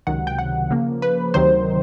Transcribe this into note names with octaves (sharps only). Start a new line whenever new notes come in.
C#2 C3 D#3 F#3 F#5
G5
F#5
C#3 F3 A#3
B4
D2 C3 D#3 F#3 C5